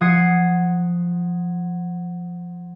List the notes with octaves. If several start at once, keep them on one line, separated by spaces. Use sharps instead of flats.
F3 F#5 D#6 G#6 C7 C#7